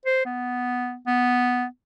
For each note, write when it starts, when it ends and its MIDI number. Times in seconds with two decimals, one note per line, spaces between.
0.06 0.24 72
0.26 0.97 59
1.07 1.65 59